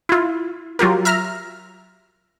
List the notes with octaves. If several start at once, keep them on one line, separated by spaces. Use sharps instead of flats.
E4 F4
F#3 F4 G4 A#4
E5 A#5 F6